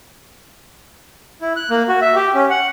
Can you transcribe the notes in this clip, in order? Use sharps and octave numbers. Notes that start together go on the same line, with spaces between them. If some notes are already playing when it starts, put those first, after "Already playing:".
E4
F#6
A#3
F#4
E5
G4
C#4
F#5